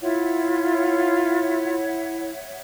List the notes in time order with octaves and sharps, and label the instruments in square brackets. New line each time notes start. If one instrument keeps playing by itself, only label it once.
[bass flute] E4 [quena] F4 [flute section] C#5 E5 F#5